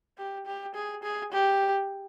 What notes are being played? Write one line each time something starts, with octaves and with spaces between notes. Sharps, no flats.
G4
G4
G#4
G#4
G4